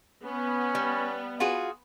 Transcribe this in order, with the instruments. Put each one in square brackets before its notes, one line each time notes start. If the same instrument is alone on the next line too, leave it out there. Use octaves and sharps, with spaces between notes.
[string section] B3 [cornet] C#4
[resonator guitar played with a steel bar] G3
F4 F#4 G#4